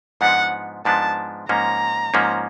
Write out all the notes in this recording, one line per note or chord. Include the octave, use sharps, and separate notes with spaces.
G#2 F3 G#3 B3 D4 F#5
G#2 F3 G#3 B3 D4 A5
G#2 F3 A#3 C#4 A#5
G#2 F3 A#3 C#4